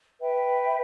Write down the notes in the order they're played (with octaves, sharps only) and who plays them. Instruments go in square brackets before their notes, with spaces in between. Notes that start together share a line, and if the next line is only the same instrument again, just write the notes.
[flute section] B4 E5 G5